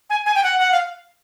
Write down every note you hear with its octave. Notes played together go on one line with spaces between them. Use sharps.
G#5
G#5
G5
F#5
F#5
F5